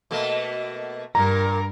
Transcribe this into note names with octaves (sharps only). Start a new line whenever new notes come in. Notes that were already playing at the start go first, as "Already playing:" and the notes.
B2 A3 A#3
G2 A#2 A#4 A#5